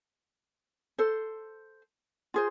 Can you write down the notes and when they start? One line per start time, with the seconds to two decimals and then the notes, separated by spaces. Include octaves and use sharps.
0.98 A4 C5
2.34 F4 G#4 C5